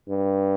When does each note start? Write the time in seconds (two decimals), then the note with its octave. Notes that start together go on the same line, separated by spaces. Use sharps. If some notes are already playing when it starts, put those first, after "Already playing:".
0.09 G2